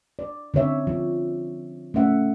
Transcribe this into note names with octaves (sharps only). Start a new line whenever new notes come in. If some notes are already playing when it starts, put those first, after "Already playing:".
D5
D3 C4 C#5 E5
F3
A3 C#4 E5 F#5